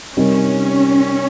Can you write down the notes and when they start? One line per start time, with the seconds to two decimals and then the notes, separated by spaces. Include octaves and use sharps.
0.17 C3 G3 C4 C#4 D#4 A#4